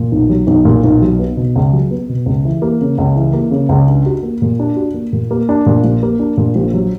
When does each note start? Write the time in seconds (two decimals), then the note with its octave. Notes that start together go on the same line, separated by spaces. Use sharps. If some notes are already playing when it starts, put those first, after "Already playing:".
Already playing: A#2
0.12 B1
0.29 F#3
0.47 B1
0.65 A#2
0.83 B1
1.02 F#3
1.19 B3
1.37 B2
1.56 C#2
1.73 F#3
1.91 B3
2.09 B2
2.26 C#2
2.45 E3
2.62 A#3
2.81 C#3
2.98 C#2
3.16 E3
3.33 A#3
3.51 C#3
3.69 C#2
3.88 D4
4.06 F#4
4.23 A#3
4.42 A#2
4.60 D4
4.76 F#4
4.94 A#3
5.13 A#2
5.31 A#3
5.49 D4
5.66 A#2
5.84 A#1
6.03 A#3
6.19 D4
6.37 A#2
6.56 A#1
6.74 F#3